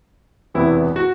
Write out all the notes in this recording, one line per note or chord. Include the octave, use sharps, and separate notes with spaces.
E1 E2 C3 E3 B3 E4
F#4